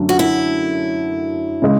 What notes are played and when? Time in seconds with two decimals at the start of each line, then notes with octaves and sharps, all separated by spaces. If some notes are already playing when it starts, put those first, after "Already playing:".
Already playing: F#2 D3 F#3 A3 C#4
0.09 F#4
0.19 E4
1.62 C#3 G#3